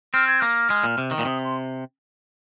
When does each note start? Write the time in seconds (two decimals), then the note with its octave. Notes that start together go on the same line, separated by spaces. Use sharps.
0.14 C4 F6
0.28 G#6
0.40 A#3 F6
0.70 G#3
0.84 A#2
0.98 C3
1.11 D#3
1.19 A#2
1.25 C3 D#6
1.43 C6